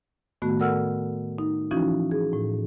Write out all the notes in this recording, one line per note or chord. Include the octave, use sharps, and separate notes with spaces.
A2 D#3 A3 B3 F#4
A4 A#4 D5 F#5 E6 F6
D#4
E3 F3 C#4 D#4 E4 F#4
G#4
A2